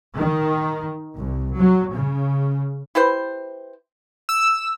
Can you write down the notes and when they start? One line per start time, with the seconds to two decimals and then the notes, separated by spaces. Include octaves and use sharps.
0.16 D#3
1.16 C2
1.56 F#3
1.94 C#3
2.95 E4 G4 B4 C5
4.29 E6